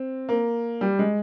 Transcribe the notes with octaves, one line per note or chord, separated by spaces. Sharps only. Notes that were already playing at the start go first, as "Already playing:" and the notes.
Already playing: C4
A#3
G3
G#3